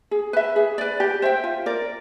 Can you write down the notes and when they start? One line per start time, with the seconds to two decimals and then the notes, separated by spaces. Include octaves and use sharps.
0.11 G#4
0.33 B4 E5
0.56 G#4
0.78 B4 D5
1.00 G4
1.22 C5 E5 G5
1.44 F4
1.66 A#4 D5